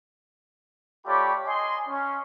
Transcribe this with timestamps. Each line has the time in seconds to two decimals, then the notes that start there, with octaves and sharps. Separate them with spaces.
1.06 A3 F4 G4 C#5 D5 B5
1.46 D#5 G#5 C6
1.88 C#4